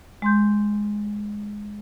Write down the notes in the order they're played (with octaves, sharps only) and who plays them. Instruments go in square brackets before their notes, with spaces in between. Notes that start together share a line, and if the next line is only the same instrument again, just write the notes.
[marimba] G#3 C6 G6